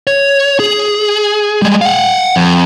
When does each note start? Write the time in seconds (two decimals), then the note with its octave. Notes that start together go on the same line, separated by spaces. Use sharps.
0.07 C#5
0.60 G#4
1.62 G3 G#3
1.81 F5 F#5
2.36 F2